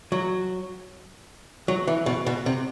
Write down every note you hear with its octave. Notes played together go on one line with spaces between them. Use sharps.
F#3
F#3
E3
B2
B2
C3